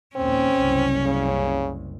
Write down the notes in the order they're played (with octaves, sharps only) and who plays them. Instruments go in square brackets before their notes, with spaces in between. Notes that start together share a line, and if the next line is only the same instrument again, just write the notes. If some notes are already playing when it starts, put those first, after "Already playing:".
[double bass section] A#1 D#2 [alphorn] C4 [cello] C#4
[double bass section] F#1 C2
[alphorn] C#3